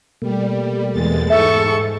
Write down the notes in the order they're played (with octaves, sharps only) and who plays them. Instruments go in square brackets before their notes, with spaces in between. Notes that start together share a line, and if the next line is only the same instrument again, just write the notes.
[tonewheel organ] B2 A3 A#3 [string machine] G3
[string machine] E2 G#3 A6
[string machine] G#2 [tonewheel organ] G#4 [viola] A4 C#6 [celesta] E5